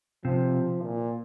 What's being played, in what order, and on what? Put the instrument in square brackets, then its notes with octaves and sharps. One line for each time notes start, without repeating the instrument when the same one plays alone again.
[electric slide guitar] C3 [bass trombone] F3
[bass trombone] A#2